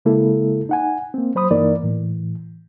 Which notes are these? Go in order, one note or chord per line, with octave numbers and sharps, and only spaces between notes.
C#3 G#3 A#3 E4 A4
D#4 F#5 G#5
A#3 C4
F#3 C5 B5 D#6
G2 E3 A#3 D#4 A#4 D5
A2 E3